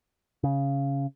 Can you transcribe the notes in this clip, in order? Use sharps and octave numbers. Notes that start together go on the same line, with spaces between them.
C#3